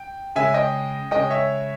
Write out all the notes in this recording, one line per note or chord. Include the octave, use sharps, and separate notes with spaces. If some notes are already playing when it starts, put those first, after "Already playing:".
Already playing: G5
C#3 G#3 E5 G#5
D#5 G5
C#3 G#3 D#5 G5
C#5 E5